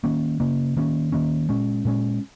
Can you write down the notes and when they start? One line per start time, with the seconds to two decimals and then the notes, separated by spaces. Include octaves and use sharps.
0.04 D#3 A#3 C#4
0.40 C#3 A#3 C#4
0.77 D#3 A#3 C#4
1.12 D#3 A#3 C#4
1.49 A#2 G#3 C#4
1.85 A#2 G#3 C#4